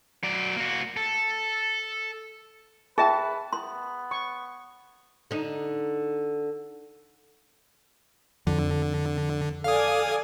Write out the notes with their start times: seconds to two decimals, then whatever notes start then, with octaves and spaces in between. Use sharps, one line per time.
0.23 F#3 D5
0.56 A#3 F#4
0.97 A4
2.98 G#4 B4 E5 G5 A5
3.53 B3 C6
4.11 C#6
5.31 D3 D#4
8.47 F2 D3
9.64 A4 D5 F5 G#5 D#6